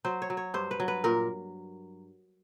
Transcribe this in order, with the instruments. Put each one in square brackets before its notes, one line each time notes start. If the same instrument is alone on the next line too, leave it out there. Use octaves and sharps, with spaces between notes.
[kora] F#3 C5
C#5
F#3
C#5
G2 C5
B4
F#3
B4
A#2 A#4